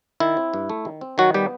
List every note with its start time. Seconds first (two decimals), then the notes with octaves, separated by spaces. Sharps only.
0.20 D#3 E4
0.37 C4
0.54 G2
0.70 A3
0.85 D#3
1.01 C4
1.18 D#3 F#3 F#4
1.34 G3 B3 G4